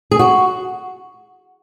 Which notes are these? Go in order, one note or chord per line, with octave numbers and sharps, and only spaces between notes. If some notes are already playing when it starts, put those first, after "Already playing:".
G#4
F#4